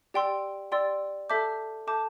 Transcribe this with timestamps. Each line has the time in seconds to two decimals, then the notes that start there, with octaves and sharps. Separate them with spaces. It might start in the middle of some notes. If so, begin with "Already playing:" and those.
0.14 G4 D5 G5 C6 E6
0.72 G4 D5 G5 C6 E6
1.30 A4 E5 A5 D6 G6
1.87 A4 E5 A5 D6 G6